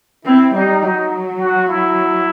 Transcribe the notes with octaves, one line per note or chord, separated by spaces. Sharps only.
C4 E4
G3 D#4
F#3 D#4
F#4
E4